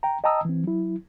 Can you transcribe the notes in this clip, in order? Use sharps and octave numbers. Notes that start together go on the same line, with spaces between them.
G5 A#5
D#5 G5 A5 A#5 D#6 E6
E3 C4
F#3 E4